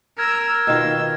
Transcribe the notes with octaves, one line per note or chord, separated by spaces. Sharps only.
A#4 E6 F6 G#6 A#6
B2 D#3 F4 E6